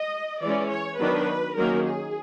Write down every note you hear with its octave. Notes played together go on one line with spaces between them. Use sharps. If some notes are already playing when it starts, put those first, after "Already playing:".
Already playing: D#5
E3 G#3 C#4 D5
C#5
D#3 F#3 B3 D4 B4
D#3 F#3 A#3 C#4 A#4
G#4